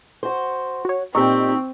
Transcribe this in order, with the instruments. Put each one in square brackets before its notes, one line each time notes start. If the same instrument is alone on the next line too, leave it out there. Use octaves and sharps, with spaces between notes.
[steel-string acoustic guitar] F#4 C5
[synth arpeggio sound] F#4 C#5
[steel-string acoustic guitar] A#2 G4 [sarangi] C4 [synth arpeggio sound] D#4 [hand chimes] C#6 E6